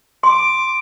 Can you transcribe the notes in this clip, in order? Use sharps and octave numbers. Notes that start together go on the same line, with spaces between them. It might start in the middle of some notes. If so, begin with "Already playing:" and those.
C6 D6